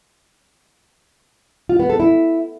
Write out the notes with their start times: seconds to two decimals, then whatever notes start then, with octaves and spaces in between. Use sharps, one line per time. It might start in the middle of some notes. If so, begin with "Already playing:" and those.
1.69 F4
1.79 B3
1.90 A4
2.00 E4